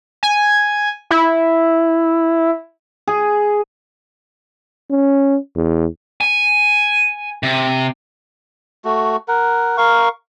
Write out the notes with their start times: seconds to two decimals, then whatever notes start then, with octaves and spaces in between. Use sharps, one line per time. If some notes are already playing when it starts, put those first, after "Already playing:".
0.23 G#5
1.11 E4
3.07 G#4
4.91 C#4
5.56 E2
6.21 G#5
7.43 C3
8.85 A3 F#4
9.28 A#4 F#5
9.77 A#4 F5 C#6